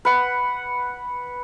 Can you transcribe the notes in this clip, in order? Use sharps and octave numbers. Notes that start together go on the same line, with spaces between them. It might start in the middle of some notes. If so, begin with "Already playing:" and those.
B4 F#5